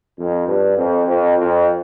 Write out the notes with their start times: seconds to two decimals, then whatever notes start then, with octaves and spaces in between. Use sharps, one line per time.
0.17 F2
0.47 G2
0.76 F2
1.06 F2
1.36 F2